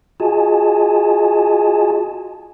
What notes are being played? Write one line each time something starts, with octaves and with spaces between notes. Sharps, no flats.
F4 F#4 G#4 D#5 G#5 A5